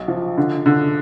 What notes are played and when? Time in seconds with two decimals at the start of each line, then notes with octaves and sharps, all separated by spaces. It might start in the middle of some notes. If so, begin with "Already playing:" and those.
Already playing: B1
0.08 F3
0.37 D3
0.66 D3